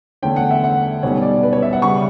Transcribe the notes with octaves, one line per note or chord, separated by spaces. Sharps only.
E2 D3 A3 C#4 G5
F#5
E5
F#5
B1 B2 G3 C#4 C#5
D5
B4
C#5
E5
F#5
C#3 G3 C#6